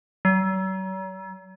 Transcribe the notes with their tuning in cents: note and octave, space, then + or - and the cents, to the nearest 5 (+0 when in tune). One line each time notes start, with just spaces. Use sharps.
F#3 +40